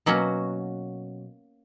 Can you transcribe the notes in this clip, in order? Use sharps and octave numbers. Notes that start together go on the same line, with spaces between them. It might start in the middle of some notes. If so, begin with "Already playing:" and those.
B2 F#3 A#3 C#4 F#4